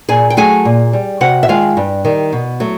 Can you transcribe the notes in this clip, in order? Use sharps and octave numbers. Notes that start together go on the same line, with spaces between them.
A#2 G#4 G#5
G5
F#3 A3 G#4 G#5
A#2
G3
C3 F#4 F#5
E5
D#3 G#3 F4 F5
G2
D#3 G3
B2
F#3 A3